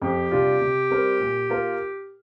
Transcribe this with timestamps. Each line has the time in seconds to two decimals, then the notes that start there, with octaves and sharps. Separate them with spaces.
0.02 F2 G4
0.31 C3 G3 D4 F4
0.61 C3
0.91 G3 C4 A#4
1.20 A#2
1.49 A#3 F4 A#4